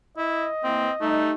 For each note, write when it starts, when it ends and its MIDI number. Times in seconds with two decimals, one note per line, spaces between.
0.17 0.47 64
0.17 1.20 75
0.64 0.87 52
0.64 0.87 58
0.64 0.91 60
1.01 1.35 55
1.01 1.32 57
1.01 1.35 63